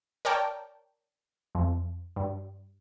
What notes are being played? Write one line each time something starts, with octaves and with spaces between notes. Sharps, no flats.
A#4 C#5 D5 G5 A5
F2
G2